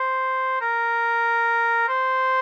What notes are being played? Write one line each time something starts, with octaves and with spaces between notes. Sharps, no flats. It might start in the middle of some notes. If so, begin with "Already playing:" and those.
Already playing: C5
A#4
C5